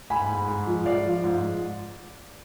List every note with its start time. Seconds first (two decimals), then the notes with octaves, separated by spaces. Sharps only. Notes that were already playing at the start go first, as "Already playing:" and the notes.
0.10 G#2 G#5 B5
0.29 G#2
0.48 G#2
0.67 F3
0.86 F3 D5 F5
1.04 F3
1.24 G#2